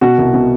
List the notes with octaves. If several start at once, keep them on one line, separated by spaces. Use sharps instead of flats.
B2 F#4
C2
B2